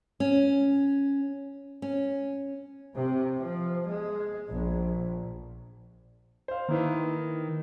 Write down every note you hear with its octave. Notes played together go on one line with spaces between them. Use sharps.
C#4
C#4
C3
F3
G#3
A#1
C5 F5
D#3 A#3 E4 B4